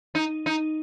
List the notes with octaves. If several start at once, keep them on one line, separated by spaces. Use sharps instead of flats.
D#4
D#4